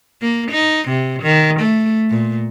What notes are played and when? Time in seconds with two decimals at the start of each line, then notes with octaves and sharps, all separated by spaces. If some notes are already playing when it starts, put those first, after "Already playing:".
0.22 A#3
0.51 D#4
0.89 C3
1.22 D#3
1.60 A3
2.10 A#2